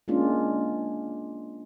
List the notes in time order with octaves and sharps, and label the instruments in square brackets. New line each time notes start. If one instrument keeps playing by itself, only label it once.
[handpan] G#3 A#3 C#4 D4 F4